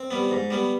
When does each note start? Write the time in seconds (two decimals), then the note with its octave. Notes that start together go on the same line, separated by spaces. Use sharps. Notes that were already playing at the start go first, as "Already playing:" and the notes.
Already playing: C4
0.11 G3 B3
0.31 G#2
0.50 G3 B3